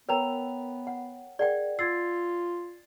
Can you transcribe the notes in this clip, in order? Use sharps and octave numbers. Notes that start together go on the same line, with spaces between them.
B3 A#4 B4 C#5 G5 A#5 F7
F#5
G#4 A#4 D5 F#5 G5
F4 E6 G#6 A6 C7